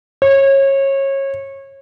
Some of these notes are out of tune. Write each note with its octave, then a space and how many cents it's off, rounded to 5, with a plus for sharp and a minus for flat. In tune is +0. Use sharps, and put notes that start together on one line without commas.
C#5 -25